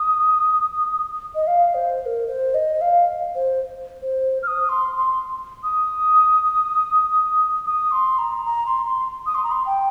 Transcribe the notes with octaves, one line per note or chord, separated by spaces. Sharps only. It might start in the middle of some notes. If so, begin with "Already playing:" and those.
Already playing: D#6
D#5
F5
C5
C5
A#4
C5
D#5
F5
C5
C5
F6
D#6
C6
C6
D#6
D#6
C6
A#5
A#5
C6
C6
D#6
C6
A#5
C6
G5